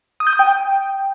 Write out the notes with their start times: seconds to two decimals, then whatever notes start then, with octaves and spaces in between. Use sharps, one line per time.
0.20 D#6
0.27 G6
0.33 D#6
0.39 G5